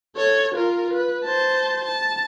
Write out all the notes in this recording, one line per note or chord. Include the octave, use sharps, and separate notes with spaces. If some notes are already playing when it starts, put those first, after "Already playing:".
A4 C#5
F4 A#4
B4
C5 A5
A5